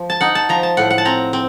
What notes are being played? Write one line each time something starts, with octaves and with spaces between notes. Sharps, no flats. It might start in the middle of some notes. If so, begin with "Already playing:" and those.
Already playing: F3
A5
D#4 F#5
A5
F3 A#5
A5
A2 F#5
F#5
A5
C4 A#5
C4